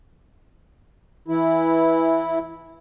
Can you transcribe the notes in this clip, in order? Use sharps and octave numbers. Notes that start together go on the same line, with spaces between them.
E3 E4